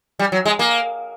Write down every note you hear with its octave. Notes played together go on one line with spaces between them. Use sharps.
G3
F#3
G#3
A#3